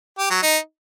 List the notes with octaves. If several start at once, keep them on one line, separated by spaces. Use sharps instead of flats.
G4
F#3
D#4